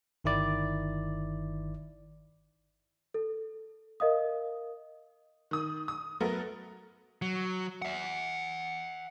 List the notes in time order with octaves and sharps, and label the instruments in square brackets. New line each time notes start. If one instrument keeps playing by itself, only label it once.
[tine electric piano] G1 D#3 E4 D5
[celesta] A4
A#4 D#5 F5 D#6
[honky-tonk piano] D#3 D#6
D#6
F#3 A3 B3 A4 A#4
[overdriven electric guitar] F#3
E5 F#5